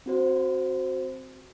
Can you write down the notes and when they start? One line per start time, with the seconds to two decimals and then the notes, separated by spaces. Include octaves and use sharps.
0.06 C4 F#4 C5